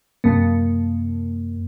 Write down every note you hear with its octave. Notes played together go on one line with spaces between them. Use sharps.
F#2 C3 A#3